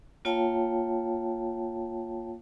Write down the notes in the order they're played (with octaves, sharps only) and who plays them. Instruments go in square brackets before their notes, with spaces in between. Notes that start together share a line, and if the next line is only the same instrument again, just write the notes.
[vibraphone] A#3 F4 C#5 F5 G5 A5